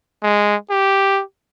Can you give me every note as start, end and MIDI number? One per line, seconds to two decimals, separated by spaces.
0.23 0.56 56
0.70 1.22 67